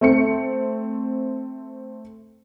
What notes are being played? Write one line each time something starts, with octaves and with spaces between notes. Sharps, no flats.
A3 C4 C#7